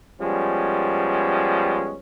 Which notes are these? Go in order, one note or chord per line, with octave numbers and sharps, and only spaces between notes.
F3 G3 G#3 B3 C#4